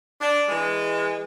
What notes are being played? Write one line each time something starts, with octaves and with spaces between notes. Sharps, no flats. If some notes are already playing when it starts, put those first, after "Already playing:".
D4
E3 G#3